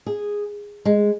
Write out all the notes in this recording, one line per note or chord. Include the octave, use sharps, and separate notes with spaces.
G#4
G#3